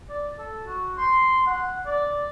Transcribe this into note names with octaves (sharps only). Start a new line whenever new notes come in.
D5
A4
F#4
C6
F#5
D5